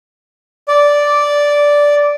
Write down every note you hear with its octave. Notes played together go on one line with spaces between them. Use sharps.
D5